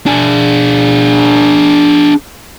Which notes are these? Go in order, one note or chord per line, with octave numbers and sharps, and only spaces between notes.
D4 G#4